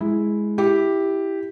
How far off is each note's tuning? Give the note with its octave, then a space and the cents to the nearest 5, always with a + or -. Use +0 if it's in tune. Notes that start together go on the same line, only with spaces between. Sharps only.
G#3 +10 E4 -5
E4 +0 G4 +0